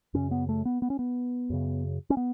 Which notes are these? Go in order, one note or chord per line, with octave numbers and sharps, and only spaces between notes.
F#2 C#3 C#4
B3
A3
B3
B3
C#4
B3
F#2 C#3
C#4
B3